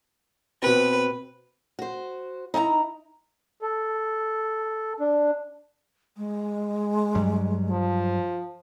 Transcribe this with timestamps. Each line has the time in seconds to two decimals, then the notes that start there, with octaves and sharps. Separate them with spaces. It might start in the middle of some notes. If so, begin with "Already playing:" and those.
0.62 B2 C4 B4
1.79 F#4 C5
2.54 D#4 E4 G#5 A#5
3.62 A4
5.00 D4
6.17 G#3
7.15 G2 F#3 G3
7.70 F3